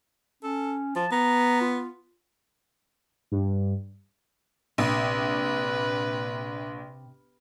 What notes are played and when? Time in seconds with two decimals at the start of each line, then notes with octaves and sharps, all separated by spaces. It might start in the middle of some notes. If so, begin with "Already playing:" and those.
0.43 C#4 A4
0.96 F3 A5
1.11 B3 A#5
1.61 F4
3.32 G2
4.78 A#1 C3 B4